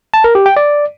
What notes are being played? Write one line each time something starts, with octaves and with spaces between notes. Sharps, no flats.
A5
A#4
G4
G5
D5